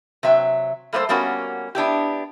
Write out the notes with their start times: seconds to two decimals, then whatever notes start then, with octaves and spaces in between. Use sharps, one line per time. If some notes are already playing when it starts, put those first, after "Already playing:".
0.23 C3 F#3 E5 G5
0.93 G3 A3 A#3 A4 C5
1.09 G3 A#3 B3 C#4 F#4
1.75 B3 D4 E4 G4